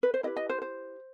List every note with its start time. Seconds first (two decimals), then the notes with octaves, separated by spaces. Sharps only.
0.03 B4
0.14 C5
0.23 E4 G4 B4 D#5
0.36 D#5
0.49 C5
0.62 C5